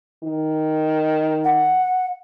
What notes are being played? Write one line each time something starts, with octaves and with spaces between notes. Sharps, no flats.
D#3
F#5